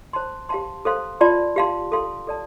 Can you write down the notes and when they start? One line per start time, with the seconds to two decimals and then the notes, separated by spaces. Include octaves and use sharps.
0.13 C5 A5 C6
0.49 G4 F5 A5 C6
0.85 A4 C5 F5 C6
1.21 F4 D5 A5 C6
1.56 G4 F5 A5 C6
1.92 A4 F5 C6
2.27 A4 D5 A5